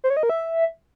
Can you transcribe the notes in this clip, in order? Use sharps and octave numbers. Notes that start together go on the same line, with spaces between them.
C5
C#5
D#5
A#4
E5